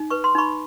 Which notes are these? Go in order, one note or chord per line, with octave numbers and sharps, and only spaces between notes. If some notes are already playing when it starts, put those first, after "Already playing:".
Already playing: D#4
B4 C#6
C6
D#4 B5 C#6